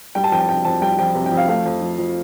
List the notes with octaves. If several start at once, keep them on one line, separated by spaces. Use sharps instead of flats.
G3 G5
A5
F2 G5
A5
C3 G5
F2 A5
G3 G5
F2 G5
C3
G5
F2
F5
A3 F5
F2
F3
F2